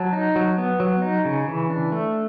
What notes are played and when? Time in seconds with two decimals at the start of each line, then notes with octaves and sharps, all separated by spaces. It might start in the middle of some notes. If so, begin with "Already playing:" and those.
Already playing: F#3 A5
0.13 D#4
0.36 F#3
0.58 B3
0.80 F#3
1.02 D#4
1.25 C#3
1.48 E3
1.70 D4
1.92 A3